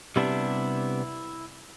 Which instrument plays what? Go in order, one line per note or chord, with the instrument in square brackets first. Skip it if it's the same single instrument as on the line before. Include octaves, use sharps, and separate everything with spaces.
[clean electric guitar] C3 G3 B3 D4 E4